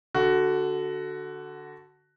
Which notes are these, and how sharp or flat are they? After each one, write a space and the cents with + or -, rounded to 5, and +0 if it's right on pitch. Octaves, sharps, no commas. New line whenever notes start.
D3 +0 F#4 +10